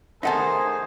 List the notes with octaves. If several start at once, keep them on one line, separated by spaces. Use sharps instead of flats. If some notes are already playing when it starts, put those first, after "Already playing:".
D#3 A3 D#4 G#4 C5 E5 F#5 A5